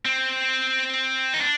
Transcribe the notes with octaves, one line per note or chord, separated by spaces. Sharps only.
C4
D#4
D4